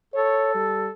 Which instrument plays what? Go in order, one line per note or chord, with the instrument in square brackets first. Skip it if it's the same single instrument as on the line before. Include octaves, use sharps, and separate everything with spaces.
[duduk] A4 [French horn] C#5
[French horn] G3